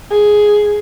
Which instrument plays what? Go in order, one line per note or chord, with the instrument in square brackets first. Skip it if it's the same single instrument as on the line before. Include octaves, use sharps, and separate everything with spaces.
[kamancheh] G#4